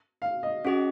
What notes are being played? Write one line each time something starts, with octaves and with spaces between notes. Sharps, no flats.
F5
D#5
C#4 F#4 G#4 D#5